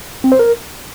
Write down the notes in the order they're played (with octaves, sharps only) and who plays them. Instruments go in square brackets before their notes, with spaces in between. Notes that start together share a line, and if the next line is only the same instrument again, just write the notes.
[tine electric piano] C4
C5
A#4